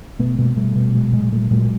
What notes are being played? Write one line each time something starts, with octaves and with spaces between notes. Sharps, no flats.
B2 A3 B3
B2 G#3 A#3
B2 G3 A3
B2
A#2 F#3 G#3
A#2 F#3 G#3
A#2 G3 A3
A#2 F#3 G#3